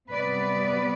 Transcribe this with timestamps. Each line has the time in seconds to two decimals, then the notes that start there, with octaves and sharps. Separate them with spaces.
0.10 C3 G3 B3 B4 D5